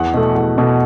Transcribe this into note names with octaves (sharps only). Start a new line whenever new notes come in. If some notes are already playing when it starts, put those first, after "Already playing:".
Already playing: E2 F#5
B2 A3
E2
B2 A3